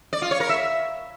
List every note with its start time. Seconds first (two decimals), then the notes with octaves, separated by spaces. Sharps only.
0.13 D5
0.22 F4
0.31 C#5
0.40 A#4
0.49 E5